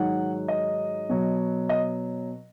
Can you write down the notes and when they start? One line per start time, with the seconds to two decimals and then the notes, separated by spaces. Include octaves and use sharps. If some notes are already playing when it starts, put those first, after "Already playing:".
Already playing: G#2 D#3 F#3 F#5
0.48 D#5
1.09 B2 F#3
1.69 D#5